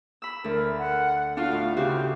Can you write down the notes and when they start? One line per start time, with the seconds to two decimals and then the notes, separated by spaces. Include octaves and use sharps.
0.22 B5 E6
0.44 D2 A#4
0.79 F#5
1.37 D4 F4 F#4 F5
1.52 A2
1.76 C#3 F#4 G4 C5